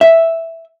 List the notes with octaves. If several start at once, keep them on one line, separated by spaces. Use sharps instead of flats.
E5